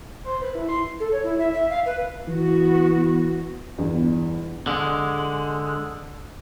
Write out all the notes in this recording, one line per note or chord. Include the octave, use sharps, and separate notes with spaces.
C5
B4
E4
C6
A4
C#5
E4
E5
E5
F5
B4
E3 B3 F#4
G1 E2
D3 G#3